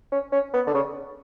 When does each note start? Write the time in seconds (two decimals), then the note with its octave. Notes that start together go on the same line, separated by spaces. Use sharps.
0.12 C#4
0.32 C#4
0.54 B3
0.67 D3
0.74 C#3